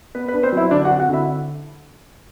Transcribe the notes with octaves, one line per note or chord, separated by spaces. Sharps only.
B3 B4
B4
D4
C4 C5
F#3 E4 E5
D3 D4 D5
F#4 F#5
C4
F#4 F#5
D3 E4 E5